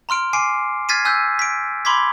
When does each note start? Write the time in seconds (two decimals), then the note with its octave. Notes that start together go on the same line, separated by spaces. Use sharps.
0.09 A#5 C6 F6 D7
0.33 G#5 D6 C7 D7
0.89 F6 G#6 A6 B6 C7 D#7
1.05 G#5 E6 F#6 G6 B6
1.39 B6 D7
1.85 B5 C6 D6 G#6 B6